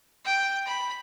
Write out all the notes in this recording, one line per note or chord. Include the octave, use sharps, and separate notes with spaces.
G5
B5